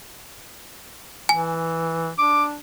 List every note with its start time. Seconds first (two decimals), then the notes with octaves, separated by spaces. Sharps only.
1.29 E3 G#5
2.18 D4 D6